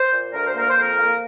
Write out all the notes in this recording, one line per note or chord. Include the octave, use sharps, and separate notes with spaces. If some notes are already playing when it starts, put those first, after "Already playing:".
Already playing: C5
A#2
D2 A#4
C5
A#3 A#4
C5
F2
A#4
A#3